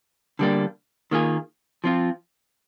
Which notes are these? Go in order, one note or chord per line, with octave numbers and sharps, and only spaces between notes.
D3 G3 A#3 D4
D#3 A#3 F4 G#4
F3 C4 F4